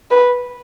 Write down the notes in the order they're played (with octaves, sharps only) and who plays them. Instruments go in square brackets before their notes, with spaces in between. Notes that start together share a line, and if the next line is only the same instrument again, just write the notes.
[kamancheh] B4